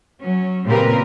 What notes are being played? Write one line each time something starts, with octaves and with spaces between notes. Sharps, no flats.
F#3 C#4
A#2 C#3 C4 G4 A#4 B4